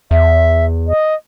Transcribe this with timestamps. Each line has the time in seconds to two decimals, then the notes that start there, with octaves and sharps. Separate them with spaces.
0.11 E2 E5
0.87 D#5